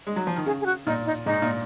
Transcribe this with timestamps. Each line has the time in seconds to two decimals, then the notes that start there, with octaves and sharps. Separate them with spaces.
0.07 G#3
0.16 F#3
0.27 F3
0.36 D#3
0.46 C#3 G#4
0.61 G#4
0.66 F#4
0.86 A#2 D#4
1.06 D#4
1.26 G#2 D#4
1.42 A#2